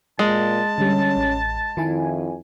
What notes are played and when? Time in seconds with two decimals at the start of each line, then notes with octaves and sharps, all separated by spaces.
0.19 A#2 G#3 A5
0.78 D3 G3 C#4
1.16 A1
1.77 F2 D#3 E4 G#5